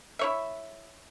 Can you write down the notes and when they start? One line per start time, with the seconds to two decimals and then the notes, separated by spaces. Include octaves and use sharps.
0.19 E4 C#5 E5